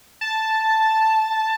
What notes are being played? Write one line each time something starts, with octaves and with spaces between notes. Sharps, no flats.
A5